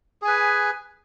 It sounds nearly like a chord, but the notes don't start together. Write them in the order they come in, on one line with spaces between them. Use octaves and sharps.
G#4 G#5 B4